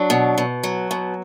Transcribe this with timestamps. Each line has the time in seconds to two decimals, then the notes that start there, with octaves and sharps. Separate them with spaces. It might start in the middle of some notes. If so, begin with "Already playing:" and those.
Already playing: F#3 D4
0.10 B2
0.38 B2
0.63 F#3
0.91 B2